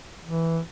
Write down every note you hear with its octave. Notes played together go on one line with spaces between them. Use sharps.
E3